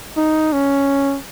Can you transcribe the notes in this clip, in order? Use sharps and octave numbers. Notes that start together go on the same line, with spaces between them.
D#4
C#4